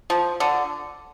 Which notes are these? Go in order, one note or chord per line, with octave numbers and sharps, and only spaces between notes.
F3
D3